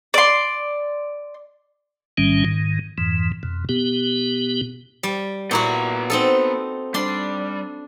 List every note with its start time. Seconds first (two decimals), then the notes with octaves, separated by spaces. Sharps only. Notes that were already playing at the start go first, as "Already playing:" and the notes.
0.14 D5 C6
2.18 A1 G#2 D#3 G3 C#4
2.45 G#2 D#3
2.98 F2 G#2 E3
3.43 F2 B2
3.69 B2 B3 G4
5.03 G3
5.51 A#2 B3 E4 F#4 A#5
6.10 C4 D#4 A4
6.94 G3 D4 C6